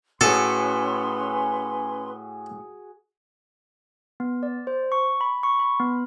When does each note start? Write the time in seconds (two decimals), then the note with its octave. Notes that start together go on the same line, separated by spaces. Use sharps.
0.21 A2 C#4 F#4 G#4 A4 B4 C6
4.20 B3
4.43 D5
4.67 C5
4.92 C#6
5.21 B5
5.43 C#6
5.60 B5
5.80 B3